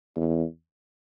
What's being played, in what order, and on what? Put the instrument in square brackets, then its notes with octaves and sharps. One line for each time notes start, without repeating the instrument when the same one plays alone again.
[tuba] E2